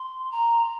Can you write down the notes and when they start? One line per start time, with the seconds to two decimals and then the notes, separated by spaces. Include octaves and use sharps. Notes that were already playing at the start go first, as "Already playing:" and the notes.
Already playing: C6
0.32 A#5